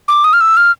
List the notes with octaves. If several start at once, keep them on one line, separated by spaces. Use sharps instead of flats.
D6
D#6
F6
E6
F6